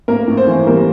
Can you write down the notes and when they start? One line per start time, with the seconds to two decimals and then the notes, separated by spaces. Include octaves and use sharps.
0.08 A2 A#3 A#4
0.28 A2
0.37 C4 C5
0.47 E3
0.66 G3 A#3 A#4